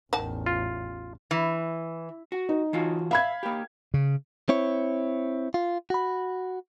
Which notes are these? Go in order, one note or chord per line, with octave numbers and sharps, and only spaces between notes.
A1 E2 D#3 F#5 A5
F4
E3
F#4
D#4
E3 F4 F#4
E5 F5 B5 G#6
A#3 G4
C#3
C4 E4 C#5
F4
F#4 B5